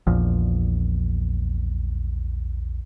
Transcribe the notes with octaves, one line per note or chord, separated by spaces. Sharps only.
A#1 E2 A#2 F3